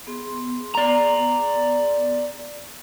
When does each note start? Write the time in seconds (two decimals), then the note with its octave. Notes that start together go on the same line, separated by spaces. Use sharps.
0.07 B3 G#4 C6
0.75 D5 A#5